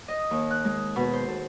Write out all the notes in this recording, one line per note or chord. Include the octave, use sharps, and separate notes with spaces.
D#5
D#2
F#6
G#3
B2
C5
A4